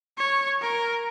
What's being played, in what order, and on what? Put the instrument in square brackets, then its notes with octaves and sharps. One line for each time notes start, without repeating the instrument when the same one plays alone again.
[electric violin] C#5
A#4